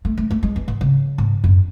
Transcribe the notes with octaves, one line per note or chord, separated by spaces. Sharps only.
A3
A3
A3
G#3
E3
G#2
C#3
G#2
F#2